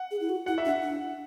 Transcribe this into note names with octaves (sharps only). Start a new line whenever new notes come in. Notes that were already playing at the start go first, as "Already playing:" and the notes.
Already playing: F#5
G#4
E4
F#4
E4 F#5
E5
D4
F#5
D4